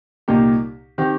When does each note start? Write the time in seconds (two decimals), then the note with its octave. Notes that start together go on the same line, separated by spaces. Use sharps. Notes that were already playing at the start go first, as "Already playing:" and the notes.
0.28 C2 A#2 A#3 D#4 G4
0.98 D#3 C4 G4